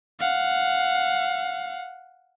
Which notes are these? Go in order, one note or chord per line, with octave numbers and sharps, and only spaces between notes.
F5 F#5